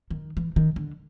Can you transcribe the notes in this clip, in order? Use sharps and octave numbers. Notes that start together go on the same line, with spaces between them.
D#3
E3
D#3
D3